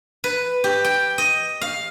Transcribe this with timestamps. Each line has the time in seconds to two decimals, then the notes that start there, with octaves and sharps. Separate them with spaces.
0.24 B4
0.64 G4
0.84 G5
1.18 D#5
1.61 F5